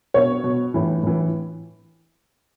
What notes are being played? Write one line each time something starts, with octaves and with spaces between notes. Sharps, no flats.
B2 C#5
B2
A2 E3
A2 E3